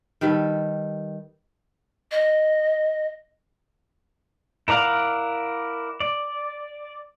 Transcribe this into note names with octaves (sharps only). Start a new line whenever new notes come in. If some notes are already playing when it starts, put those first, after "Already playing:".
D#3 G3 A4 B4
D#5
E4 A#4 D5 F5 F#5
D5